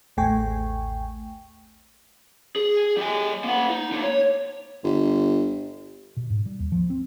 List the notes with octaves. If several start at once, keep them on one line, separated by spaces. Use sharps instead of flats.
A1 D#2 A3 G5 G#5 C#6
G#4
G3 G#5
A#3 F#5
D#4
D3 A#3
C#5
G1
B2
G#2
G3
D#2
F3
C4